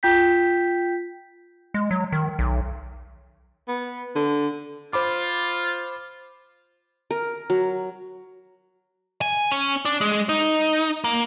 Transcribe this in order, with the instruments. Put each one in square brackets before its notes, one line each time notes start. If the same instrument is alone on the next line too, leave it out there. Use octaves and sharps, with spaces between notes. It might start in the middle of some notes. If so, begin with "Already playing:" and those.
[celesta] F4 G5 G6 B6
[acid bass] G#3
F#3
D#3
B1
[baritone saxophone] B3
D3
[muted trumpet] F4 [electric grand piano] C5 B5 D6
[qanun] A#4
F#3
[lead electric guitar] G#5
C#4
D4
G#3
D#4
A#3